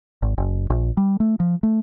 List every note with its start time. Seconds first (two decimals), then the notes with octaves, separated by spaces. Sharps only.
0.22 G#1
0.38 F#1
0.70 A#1
0.97 G3
1.20 A3
1.40 F3
1.63 A3